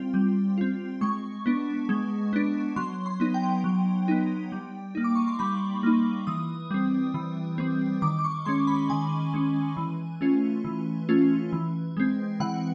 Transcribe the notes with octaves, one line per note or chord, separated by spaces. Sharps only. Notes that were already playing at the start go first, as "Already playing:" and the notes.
Already playing: G3 C4 F4
G3
C4 F4
G#3 C#6
B3 D4
G#3
B3 D4
F#3 C6
C6
B3 D#4
G5
F#3
B3 D#4
G3
A#3 D#4
D6
C#6
C6
G3 B5
A#3 D#4
E3 D#6
G3 C4
E3
G3 C4
D#3 D6
D6
C#6
G#3 C#4 C6
B5
D#3 G#5
G#3 C#4
E3
A3 C#4 F4
E3
A3 C#4 F4
E3
G#3 C4
E3 F#5